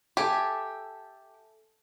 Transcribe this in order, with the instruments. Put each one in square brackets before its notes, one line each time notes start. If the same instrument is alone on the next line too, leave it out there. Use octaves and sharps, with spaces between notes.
[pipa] G4 [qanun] A4 E5 G#5